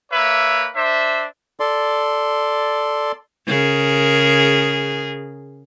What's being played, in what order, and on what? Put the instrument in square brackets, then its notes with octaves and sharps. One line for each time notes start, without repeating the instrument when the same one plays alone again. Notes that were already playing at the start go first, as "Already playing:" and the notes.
[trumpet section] A#3 B4 C#5 E5
D4 C5 E5
[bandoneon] A4 D5 C6
[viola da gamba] C#3 G#4 A#4